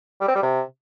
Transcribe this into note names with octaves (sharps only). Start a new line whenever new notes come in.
G3
C4
G3
C3